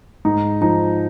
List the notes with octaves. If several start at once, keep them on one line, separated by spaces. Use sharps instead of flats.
G#2 D#4
F3 D#4